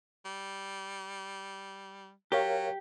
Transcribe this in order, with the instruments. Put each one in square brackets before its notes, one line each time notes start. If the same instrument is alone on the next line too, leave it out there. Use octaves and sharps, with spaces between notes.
[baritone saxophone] G3
[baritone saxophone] F#3 [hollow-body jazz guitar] G4 [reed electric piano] A#4 C#5 F5